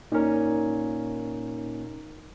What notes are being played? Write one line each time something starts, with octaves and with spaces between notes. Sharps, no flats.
A#2 C#4 D#4 A#4